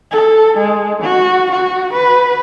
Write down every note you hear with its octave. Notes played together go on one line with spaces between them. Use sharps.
A4
G#3
F#4
F#4
B4